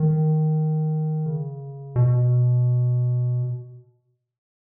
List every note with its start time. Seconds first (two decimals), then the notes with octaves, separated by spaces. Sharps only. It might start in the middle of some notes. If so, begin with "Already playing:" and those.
Already playing: D#3
1.26 C#3
1.96 B2